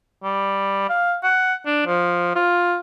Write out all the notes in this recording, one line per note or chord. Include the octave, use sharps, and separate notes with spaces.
G3
F5
F#5
D4
F3
F4